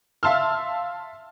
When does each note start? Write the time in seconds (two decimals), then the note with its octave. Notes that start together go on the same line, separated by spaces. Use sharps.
0.23 E5 F5 A5 C6 E6 F6